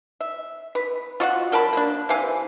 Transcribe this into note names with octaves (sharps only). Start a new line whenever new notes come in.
E5
B4
F4 F#4 D#5 F#5
F#3 A#4 A5 B5
A#3 D4
C3 E3 F5 G#5